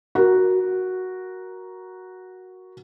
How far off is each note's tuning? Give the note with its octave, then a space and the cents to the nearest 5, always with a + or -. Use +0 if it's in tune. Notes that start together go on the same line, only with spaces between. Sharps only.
F#4 +0 A#4 +10